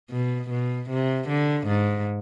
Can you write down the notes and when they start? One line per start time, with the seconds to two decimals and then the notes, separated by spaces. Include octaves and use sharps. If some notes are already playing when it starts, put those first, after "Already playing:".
0.11 B2
0.49 B2
0.89 C3
1.28 D3
1.67 G#2